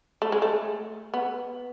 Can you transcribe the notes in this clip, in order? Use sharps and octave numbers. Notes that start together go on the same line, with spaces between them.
A3
G#3
A3
B3